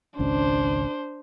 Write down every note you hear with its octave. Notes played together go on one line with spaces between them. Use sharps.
G#1 C#2 C#4 D4 C5